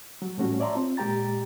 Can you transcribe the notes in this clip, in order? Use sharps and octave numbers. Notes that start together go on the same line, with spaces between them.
F#3
A2 F3 G3 A3 C#4 F#4
C#5 D5 E5 A5 A#5 C6
C4 F4
A#2 G#3 G4 G5 A#5 A6